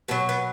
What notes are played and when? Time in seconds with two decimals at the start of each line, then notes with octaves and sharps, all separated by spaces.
0.08 B2 F#3 B3
0.29 B3